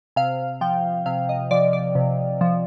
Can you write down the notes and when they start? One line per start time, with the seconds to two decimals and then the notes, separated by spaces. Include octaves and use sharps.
0.16 C3 F5
0.61 F3 G5
1.06 C3 F5
1.29 D#5
1.51 F3 D5
1.73 D5
1.95 C3
2.41 F3